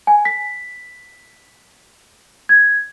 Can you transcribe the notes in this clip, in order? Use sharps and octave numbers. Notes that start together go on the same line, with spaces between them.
G#5
B6
G#6